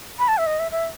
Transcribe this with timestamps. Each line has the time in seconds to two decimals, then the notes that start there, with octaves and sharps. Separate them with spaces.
0.19 B5
0.28 A5
0.38 E5
0.46 D#5
0.59 E5
0.71 E5